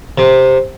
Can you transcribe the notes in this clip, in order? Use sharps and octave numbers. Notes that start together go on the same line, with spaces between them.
C3